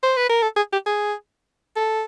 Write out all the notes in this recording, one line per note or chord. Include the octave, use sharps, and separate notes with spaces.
C5
B4
A#4
A4
G#4
G4
G#4
A4